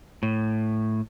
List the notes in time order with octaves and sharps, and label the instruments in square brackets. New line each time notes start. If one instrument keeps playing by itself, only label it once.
[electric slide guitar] A2